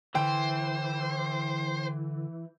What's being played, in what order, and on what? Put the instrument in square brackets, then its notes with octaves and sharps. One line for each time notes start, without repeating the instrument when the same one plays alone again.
[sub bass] D3 [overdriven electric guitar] E3 [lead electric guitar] C5 [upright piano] G5